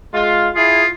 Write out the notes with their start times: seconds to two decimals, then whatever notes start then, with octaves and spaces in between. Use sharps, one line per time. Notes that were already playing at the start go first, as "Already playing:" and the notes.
0.13 G#3 F4
0.55 E4 F4 G#4